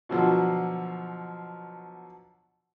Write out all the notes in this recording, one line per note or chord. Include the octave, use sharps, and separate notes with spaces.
B2 D3 F3 F#3